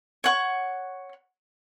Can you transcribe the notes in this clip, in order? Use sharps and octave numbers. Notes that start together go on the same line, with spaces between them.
C#5 F#5 C#6